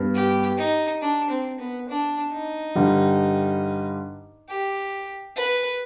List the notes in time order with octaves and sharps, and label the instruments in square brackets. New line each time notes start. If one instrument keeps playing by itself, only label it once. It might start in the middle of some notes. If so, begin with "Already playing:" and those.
Already playing: [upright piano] G2 B3
[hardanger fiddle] G4
D#4
D4
C4
B3
D4
D#4
[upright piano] G2 D3 G3
[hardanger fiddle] G4
B4